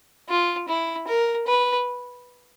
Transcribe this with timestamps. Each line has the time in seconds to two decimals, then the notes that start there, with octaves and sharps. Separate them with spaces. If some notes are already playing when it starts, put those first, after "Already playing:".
0.29 F4
0.68 E4
1.07 A#4
1.47 B4